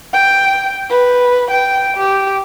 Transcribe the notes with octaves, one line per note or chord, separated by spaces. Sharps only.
G5
B4
G5
G4